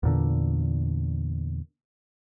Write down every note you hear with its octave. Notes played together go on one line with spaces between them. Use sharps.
E2 A#2 D3